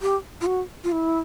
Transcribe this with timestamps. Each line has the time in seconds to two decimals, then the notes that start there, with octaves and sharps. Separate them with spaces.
0.02 G4
0.41 F4
0.46 F#4
0.84 F4
0.92 E4